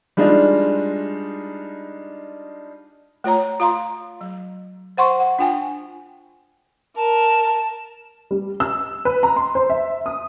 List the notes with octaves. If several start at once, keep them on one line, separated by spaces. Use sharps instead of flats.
G3 G#3 D4 D#4 F4
A3 F4 C#5 A#5
F4 F5 A#5 C6
F#3
C5 F#5 C6 C#6
F#5
D4 F4 G5 G#5
A#4 A5
G3
E6
B4
A#5
C6
C5
E5
D#6